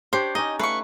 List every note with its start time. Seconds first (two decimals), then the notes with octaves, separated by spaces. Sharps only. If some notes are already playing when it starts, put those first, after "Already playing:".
0.13 D4 G4 C5 C#5
0.35 C#4 D#4 D#5
0.59 A3 B4 F5 C#6